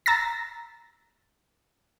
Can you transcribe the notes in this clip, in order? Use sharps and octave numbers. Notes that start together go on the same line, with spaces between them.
A#5 E6 A6 A#6